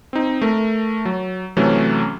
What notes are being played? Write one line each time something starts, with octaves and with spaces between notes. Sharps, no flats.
C4 D#4
A3 A#4
F#3
C3 E3 F#3 A3 C#4